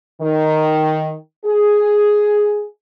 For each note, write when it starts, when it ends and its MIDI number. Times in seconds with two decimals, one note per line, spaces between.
0.21 1.13 51
1.45 2.65 68